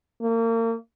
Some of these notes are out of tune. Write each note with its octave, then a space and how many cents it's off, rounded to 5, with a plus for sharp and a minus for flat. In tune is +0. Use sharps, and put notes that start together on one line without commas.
A#3 -35